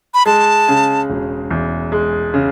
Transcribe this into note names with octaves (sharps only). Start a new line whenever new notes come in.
B5
G#3 A5
C#3
E1
E2
G#3
C#3